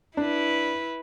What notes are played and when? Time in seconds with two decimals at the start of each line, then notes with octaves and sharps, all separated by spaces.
0.17 D4 E4 B4